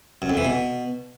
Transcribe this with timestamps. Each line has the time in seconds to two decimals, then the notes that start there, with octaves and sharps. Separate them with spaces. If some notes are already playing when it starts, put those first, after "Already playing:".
0.22 F#2
0.29 F2
0.37 E3
0.45 B2